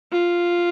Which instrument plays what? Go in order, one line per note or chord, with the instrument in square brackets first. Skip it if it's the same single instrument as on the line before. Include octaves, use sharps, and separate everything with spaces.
[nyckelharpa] F4